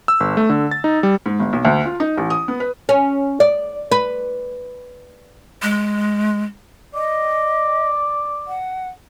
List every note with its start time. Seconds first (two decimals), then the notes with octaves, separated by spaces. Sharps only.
0.08 E6
0.20 G1
0.37 A3
0.50 D3
0.71 A6
0.84 D#4
1.03 G3
1.26 G#2
1.40 G1
1.53 B1
1.65 D2
1.85 F4
2.00 D#4
2.18 A1
2.30 D#6
2.48 B3
2.60 B4
2.89 C#4
3.40 D5
3.92 B4
5.62 G#3
6.94 D5 D#5
8.47 F#5